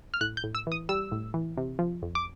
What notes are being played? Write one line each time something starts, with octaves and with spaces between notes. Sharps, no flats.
F6
A2 F#6
G6
A2
E6
E3 D#6
G3 E6
A2
E3
C3
F3
F2
D6